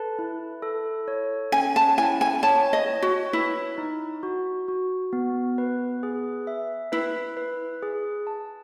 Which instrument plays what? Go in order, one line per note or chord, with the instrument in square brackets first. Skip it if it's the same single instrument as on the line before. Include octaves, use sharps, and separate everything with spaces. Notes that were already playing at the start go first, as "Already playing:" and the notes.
Already playing: [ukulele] A4 [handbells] B4
[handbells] E4
A4
C#5
[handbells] C#4 [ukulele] G#5
[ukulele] A5
[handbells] E4 [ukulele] G#5
[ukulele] G#5
[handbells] C#5 [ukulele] A5
[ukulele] D#5
[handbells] C#5
[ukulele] F#4
[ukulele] E4 [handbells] B4
[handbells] D#4
F#4
F#4
B3
B4
G#4
E5
[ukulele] E4 [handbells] B4
[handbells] B4
G#4
A5